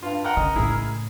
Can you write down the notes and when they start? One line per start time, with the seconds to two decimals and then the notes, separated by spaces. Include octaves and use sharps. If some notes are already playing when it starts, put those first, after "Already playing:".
0.03 G2 F4
0.25 A#4 F#5 G5 A#5
0.37 C#3 D#5
0.56 A2 C#3 E4 G#4